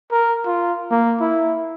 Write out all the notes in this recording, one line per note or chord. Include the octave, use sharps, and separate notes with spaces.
A#4
F4
A#3
E4